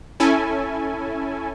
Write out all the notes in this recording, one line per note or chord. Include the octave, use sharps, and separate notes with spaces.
C#4 E4 A4 G#5